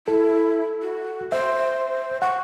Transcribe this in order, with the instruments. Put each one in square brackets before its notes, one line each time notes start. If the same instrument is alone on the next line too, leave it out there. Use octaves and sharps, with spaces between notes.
[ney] E4 [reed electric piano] A4
[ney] F#4
[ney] C5 [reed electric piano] E5
[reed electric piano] F#5 [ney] C#6